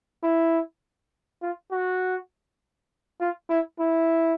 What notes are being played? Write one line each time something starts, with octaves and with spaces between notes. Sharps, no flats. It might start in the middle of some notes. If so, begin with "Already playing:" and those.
E4
F4
F#4
F4
E4
E4